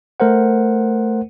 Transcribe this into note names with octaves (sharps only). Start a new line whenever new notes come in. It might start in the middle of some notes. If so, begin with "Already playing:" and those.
A3 A#4 C5 F#5